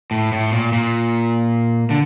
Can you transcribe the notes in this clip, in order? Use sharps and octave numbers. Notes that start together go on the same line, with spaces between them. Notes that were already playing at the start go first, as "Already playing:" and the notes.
A2
A2
A#2
A#2
D3